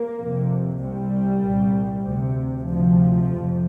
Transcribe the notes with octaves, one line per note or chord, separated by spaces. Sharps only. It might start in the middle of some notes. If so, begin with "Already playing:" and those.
Already playing: A#3
F2 C3
C2 C3 G3
C2 A#2
D2 C3
D2 C3 F3
F2 C3